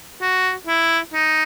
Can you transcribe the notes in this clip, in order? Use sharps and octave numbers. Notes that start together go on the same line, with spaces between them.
F#4
E4
D#4